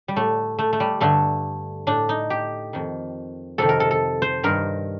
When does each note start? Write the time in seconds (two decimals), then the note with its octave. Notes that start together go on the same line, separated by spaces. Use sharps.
0.08 G3
0.16 A2 A3
0.59 A3
0.73 A3
0.80 G3
1.01 G2 D3 A3
1.87 A2 D4
2.09 D#4
2.30 G4
2.73 F2 D#3
3.58 F2 C3 D#3 A4
3.69 A#4
3.80 A4
3.91 A4
4.22 C5
4.43 G2 D#3 A#4